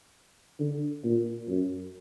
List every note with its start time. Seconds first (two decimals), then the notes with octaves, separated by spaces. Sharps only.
0.60 D3
1.04 A#2
1.48 F#2